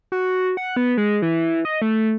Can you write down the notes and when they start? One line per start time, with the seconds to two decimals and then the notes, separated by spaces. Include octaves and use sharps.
0.12 F#4
0.57 F#5
0.76 B3
0.98 G#3
1.22 E3
1.65 D#5
1.82 A3